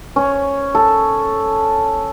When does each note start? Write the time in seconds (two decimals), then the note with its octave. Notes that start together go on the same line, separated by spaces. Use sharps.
0.16 C#4
0.75 A4